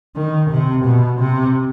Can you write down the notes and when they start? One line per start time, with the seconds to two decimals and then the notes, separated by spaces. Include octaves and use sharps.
0.16 D#3
0.50 C3
0.85 B2
1.20 C3